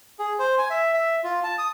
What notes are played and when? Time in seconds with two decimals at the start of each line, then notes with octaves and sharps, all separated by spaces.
0.19 G#4
0.39 C5
0.58 G#5
0.70 E5
0.94 E5
1.24 F4
1.44 A5
1.58 D#6